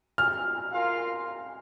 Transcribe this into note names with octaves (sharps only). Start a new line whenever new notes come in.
F6
F4 A#4 F5